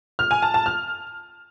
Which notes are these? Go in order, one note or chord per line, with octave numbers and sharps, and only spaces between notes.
F6
G#5
A5
A5
F6